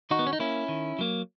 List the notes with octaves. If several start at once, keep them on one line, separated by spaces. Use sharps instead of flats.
D#3 D#4 F#4
B3
C#4
D#4
A#3 C#4 E4
D#3
F#3 A#3